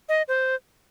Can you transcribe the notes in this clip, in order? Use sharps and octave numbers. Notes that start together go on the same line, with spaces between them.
D#5
C5